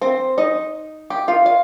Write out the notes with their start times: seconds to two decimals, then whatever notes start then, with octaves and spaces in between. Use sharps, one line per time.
0.01 C4 C5
0.38 D#4 D#5
1.10 G4 G5
1.28 F4 F5
1.46 F4 F5